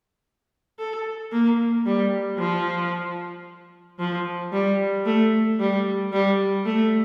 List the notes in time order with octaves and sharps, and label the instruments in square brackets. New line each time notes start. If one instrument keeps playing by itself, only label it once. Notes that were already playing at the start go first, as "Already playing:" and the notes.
[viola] A4
A#3
G3
F3
F3
G3
A3
G3
G3
A3